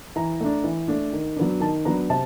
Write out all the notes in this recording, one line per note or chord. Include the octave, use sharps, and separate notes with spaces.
E3 A#5
A3 D4
E3
A3 D4
D#3
F#3 B3 D4
D#3 A5
F#3 B3 D4 A#5
C3 A5